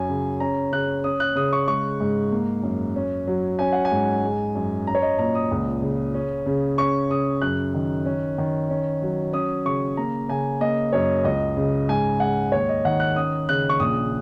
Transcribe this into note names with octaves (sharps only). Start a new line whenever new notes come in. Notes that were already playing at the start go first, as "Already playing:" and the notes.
Already playing: F#2 C#4 G#5
C#3
C#4 A#5
C#3 F#6
C#4 D#6
F#6
C#3 D#6
C#6
G#3 C#6
G#2
A#3
F#2
C#4
F#3
C#4 G#5
F#5
G#5
G#2
G#3
F#2
C#4 A#5
C#5
D#5
A#2 A#5
D#6
C#2
C#3
C#4
C#3
C#4 C#6
C#3 D#6
F#2 F#6
D#3
C#4
D#3
C#4
F#3
C#4 D#6
C#3 C#6
A#3 A#5
C#3 G#5
A#3 D#5
F#2 C#5
C#2 D#5
C#3
G#2 G#5
G#3 F#5
D#2 C#5
D#5
D#3 F#5
F#6
C#4 D#6
C#3 F#6
C#6
A#1 D#6